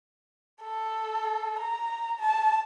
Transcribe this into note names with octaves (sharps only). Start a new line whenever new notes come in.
A4
A#5
A5